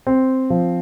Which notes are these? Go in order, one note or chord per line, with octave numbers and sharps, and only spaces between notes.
C4
F3